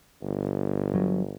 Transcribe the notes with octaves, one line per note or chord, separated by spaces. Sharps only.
G1
F#3